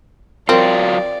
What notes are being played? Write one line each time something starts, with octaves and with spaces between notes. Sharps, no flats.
F#3 C4 F4 A#4 D5